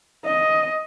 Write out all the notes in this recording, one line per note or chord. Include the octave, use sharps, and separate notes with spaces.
D#5